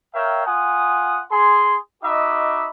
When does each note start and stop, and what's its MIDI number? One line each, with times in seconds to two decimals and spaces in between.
0.15 0.44 70
0.15 0.44 73
0.15 0.44 76
0.15 0.44 77
0.15 0.44 79
0.46 1.23 65
0.46 1.23 78
0.46 1.23 80
0.46 1.23 87
1.31 1.76 68
1.31 1.76 84
2.03 2.71 63
2.03 2.71 66
2.03 2.71 75
2.03 2.71 76
2.03 2.71 83
2.03 2.71 86